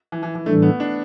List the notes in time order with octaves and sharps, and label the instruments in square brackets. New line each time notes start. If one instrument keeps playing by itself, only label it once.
[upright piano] E3
E3
E3
[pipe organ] A2 E3 G3 D4 A4 [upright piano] A3
[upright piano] B3
D4